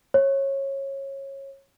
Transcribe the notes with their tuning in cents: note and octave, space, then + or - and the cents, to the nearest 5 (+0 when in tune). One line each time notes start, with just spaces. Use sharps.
C#5 -20